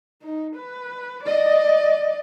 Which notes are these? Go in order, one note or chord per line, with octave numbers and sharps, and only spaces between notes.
D#4
B4
D5 D#5